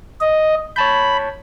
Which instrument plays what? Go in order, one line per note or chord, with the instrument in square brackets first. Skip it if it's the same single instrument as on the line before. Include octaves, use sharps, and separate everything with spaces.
[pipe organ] D#5
[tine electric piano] C#5 A5 G6 [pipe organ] B5